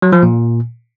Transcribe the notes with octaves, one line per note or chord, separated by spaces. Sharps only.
F#3
F3
A#2